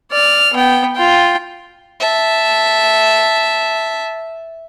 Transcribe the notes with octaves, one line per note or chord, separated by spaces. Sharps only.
D5 F6
B3 G5
F4 G5
E5 A5